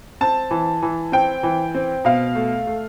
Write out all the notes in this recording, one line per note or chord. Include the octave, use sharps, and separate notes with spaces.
C4 A5
E3
E3
C4 G5
E3
C4
B2 F5
A3
A3